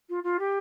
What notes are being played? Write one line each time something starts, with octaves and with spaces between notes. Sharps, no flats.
F4
F4
G4